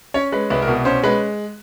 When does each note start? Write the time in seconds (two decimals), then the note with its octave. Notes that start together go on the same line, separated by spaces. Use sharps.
0.14 C#4 C#5
0.32 G#3 B4
0.50 C2 B4
0.62 A#4
0.67 B2
0.85 C#4 C5
1.03 G#3 B4